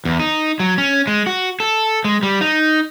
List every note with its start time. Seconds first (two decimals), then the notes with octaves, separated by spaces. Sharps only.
0.05 E2
0.20 D#4
0.60 F#3
0.78 C#4
1.07 G#3
1.26 F#4
1.60 A4
2.04 G#3
2.23 G3
2.41 D#4